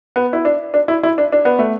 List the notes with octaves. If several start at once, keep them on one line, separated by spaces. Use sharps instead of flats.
B3
E4
D4
D4
E4
E4
D4
D4
B3
A3